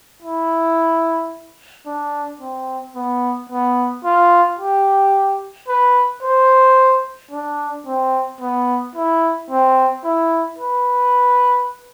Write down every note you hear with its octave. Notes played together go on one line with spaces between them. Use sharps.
E4
D4
C4
B3
B3
F4
G4
B4
C5
D4
C4
B3
E4
C4
E4
B4